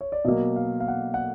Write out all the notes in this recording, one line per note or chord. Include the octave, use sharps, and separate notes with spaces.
C#5
D5
B2 F#3 A#3 D#5
F5
F5
F#5
F#5